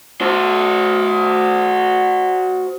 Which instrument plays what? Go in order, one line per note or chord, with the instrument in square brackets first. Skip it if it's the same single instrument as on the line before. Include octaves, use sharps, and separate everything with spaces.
[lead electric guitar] F#4 C5